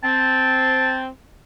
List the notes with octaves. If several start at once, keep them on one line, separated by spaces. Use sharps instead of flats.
C4 A5